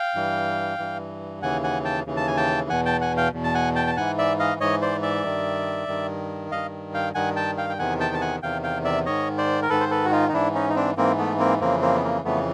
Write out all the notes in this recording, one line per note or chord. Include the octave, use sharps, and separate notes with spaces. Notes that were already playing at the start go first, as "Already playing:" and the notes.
Already playing: F5 G5
G2 E3
G2 E3
D#2 C#3 E3 F#5 G#5
F#5 G#5
G5 A5
D#2 C#3 E3
A5
G#5
G5 A5
E2 B2 F#5 G#5
G5 A5
F#5 G#5
F5 G5
E2 B2
A5
F#5 G#5
G5 A5
A5
G#2 E3 F#5 G#5
D5 E5
D#5 F5
G#2 E3 C#5 D#5
C5 D5
D5 E5
G2 D#3
G2 D#3
G2 D#3 D#5 F5
F5 G5
G2 D#3 F#5 G#5
G5 A5
F5 G5
G5
E2 C3 D#3 F#5 G#5
G5 A5
A5
F#5 G#5
E2 C3 D#3 F5 G5
F5 G5
D5 E5
G#2 D#3 C#5 D#5
C5 D5
A#4
G#2 D#3 A4 B4
C5
A4 B4
F#4
D#4 F4
D#4
G#2 E3 D4 E4
C#4 D#4
D#4
C4 D4
G#2 E3 A#3 C4
A3 B3
A#3 C4
F2 C#3 E3 A#3 C4
A#3 C4
B3
A#3
F2 C#3 E3 A3 B3